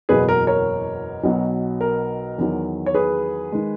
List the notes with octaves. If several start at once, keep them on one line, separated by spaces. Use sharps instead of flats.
F#1 E2 B2 F#3 G#4 B4
A#4
A#4 C#5
B1 B2 F#3
A#4
E2 D#3 F#3
C#5
G#4 B4
D#3 G#3